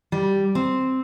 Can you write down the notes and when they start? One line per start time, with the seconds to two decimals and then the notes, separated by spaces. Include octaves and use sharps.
0.12 G3
0.55 C4